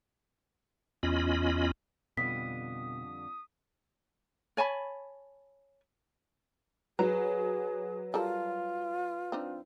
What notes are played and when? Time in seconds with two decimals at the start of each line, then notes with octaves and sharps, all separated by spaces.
1.03 E2 C#4 F4 D#5 B5
2.17 F2 B2 D3 G3 D#6 B6
4.57 C#5 G#5 A5 B5
6.99 F#3 G#4 B4 A#5
8.14 G3 F4 A4 A#4
9.32 C4 D4 D#4